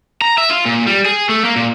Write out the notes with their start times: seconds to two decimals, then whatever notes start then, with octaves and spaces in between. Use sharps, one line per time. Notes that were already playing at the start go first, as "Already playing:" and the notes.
0.21 A#5
0.38 E5
0.50 F4
0.66 A#2
0.87 G3
1.05 G#4
1.29 A3
1.45 A#3
1.56 A#2